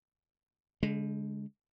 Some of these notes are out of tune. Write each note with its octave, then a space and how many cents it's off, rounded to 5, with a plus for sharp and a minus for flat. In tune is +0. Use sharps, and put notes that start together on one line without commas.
D3 -40 G#3 +0